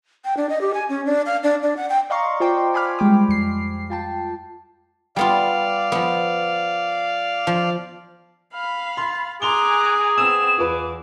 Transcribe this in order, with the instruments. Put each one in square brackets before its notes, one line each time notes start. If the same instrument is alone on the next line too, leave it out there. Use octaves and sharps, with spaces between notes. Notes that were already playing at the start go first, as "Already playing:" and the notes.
[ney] G5
D4
D#5
G4
G#5
C#4
D4
F5
D4
D4
F#5
G5
[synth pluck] D5 D#5 F5 A#5 C6 C#6
F4 C5 D5 G5 C6 D6
G#5 B5 D6 F6
G3 G#3 G5 D6
F2 C7
F4 G5 A5
[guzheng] G3 B3 F4 [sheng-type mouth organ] D5 F5
[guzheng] F3 B3
F3
[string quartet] F5 B5 [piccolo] F6
[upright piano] C6 [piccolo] A6
[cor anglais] G#4 [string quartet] G#5 A#5 D6 [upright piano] C6 F7 G7 [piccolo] F#6
[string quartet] B3 C4 [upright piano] D#6 E6 [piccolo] E7
[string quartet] E2 [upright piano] F4 B4 [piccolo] D6